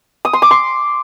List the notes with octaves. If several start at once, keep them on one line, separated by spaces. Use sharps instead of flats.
D#6
C6
D6
C6